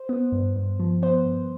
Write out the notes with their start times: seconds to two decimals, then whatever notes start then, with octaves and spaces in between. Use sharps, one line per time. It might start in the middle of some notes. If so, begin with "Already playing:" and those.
Already playing: C5
0.09 B3
0.32 G2
0.56 G2
0.80 F3
1.02 B3 C5
1.26 G2